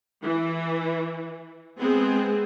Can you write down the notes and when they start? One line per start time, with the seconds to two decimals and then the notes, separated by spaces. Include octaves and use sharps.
0.23 E3
1.78 G#3 B3 C4 G#4